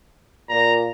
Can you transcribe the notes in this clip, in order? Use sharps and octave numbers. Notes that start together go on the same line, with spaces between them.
A#2 A#5